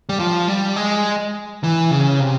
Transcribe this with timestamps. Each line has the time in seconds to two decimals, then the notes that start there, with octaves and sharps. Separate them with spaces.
0.09 G3
0.19 F3
0.48 G3
0.76 G#3
1.64 E3
1.91 C#3
2.20 C3